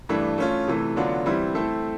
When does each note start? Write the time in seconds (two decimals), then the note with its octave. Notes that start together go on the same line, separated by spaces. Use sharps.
0.09 G2 E3 A3 D4
0.38 A3 C#4 F4
0.68 C3 E3 A3
0.96 D3 F#3 B3 D4 F4
1.26 E3 G3 C4 E4
1.55 A3 C4 E4 A4